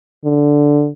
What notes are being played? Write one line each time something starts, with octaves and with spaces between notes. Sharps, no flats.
D3